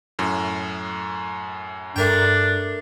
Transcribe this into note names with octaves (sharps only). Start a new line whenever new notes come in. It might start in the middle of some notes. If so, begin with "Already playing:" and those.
F#2 A2
G2 A3 D4 A#4 G5